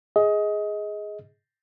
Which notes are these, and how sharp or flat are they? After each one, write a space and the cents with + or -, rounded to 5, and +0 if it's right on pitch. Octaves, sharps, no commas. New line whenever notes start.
G#4 +0 D#5 +25